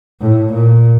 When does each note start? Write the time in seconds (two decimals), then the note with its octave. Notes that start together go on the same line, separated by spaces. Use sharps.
0.21 A2
0.53 A#2